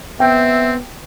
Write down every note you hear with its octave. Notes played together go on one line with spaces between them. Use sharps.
B3 C4 E5 G5